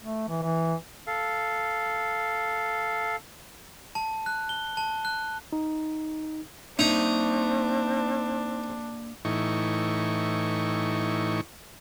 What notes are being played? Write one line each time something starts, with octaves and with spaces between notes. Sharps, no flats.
A3
E3
E3
A4 F5
A5
F#6
G7
A5
F#6
D#4
A#3 C4 D4 D#4 E5
A2 E3 D#4 C#6